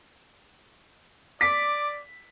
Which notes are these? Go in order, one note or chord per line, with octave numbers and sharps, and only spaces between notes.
D5 D6 B6